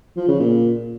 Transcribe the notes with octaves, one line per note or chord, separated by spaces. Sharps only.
F3
C#3
A#2